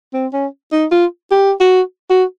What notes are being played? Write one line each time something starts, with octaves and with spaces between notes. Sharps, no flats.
C4
C#4
D#4
F4
G4
F#4
F#4